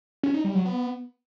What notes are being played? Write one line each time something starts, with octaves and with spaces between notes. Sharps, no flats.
C#4
D#4
G3
F#3
B3